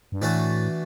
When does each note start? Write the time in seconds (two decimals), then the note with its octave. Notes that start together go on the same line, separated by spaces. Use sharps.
0.12 G2
0.21 A2 E3 A3 D4 F#4 A4